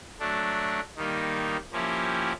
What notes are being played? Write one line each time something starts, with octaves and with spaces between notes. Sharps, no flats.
F#3 A3 D4
D#3 G3 A#3 D#4
F3 A#3 C#4 E4 G4